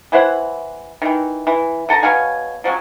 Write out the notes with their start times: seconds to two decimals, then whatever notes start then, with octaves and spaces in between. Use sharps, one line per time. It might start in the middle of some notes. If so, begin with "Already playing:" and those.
0.12 E3 E4 C5 F#5
1.02 D#3 E3
1.47 E3
1.89 D3 A4 A5 A#5
2.03 B2 C#5 F5 G#5
2.64 F3 F#3 G#3 C#4